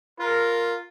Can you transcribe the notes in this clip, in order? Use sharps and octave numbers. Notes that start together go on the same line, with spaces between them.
F4 A#4